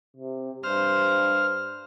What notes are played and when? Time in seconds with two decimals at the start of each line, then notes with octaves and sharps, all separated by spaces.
0.17 C3
0.64 G2 C5 F6